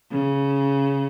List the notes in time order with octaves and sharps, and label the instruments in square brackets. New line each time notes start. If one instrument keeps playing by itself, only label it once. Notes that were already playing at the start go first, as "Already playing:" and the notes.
[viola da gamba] C#3